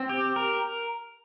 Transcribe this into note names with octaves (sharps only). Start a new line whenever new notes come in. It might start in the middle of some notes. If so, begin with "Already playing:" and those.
Already playing: C4
G4
A#4